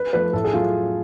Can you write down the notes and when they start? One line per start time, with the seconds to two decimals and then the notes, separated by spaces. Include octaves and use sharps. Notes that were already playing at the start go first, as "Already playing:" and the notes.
Already playing: B4
0.13 F3 A3 B4
0.33 A2 A4
0.45 G#4
0.54 F#3 F4